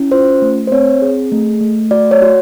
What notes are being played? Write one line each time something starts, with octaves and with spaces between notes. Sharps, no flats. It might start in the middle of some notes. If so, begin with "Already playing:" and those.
Already playing: C#4 E4
F4 C5
A3
C5
C4 C#5
G#4
A3
A3
F#4 D5
C#5
F#4